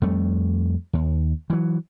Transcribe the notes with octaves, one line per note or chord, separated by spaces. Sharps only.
F2 G3 A3
D#2
E3 F#3